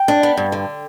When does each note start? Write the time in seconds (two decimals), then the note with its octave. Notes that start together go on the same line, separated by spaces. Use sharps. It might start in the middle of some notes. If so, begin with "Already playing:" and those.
Already playing: G5
0.08 D4
0.23 B3
0.37 G2
0.52 D3